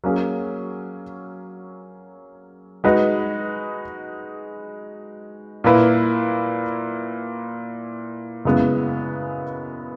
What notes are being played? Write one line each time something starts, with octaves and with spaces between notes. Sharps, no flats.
F#3 A#3 C#4 G#4
G#3 D#4 F#4 B4
A#2 A#3 E4 B4
F#2 C#3 G#3 B3 E4